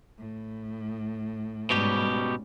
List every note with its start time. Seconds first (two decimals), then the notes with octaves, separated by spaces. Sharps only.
0.19 A2
1.70 G#2 B2 G3 C#4 G4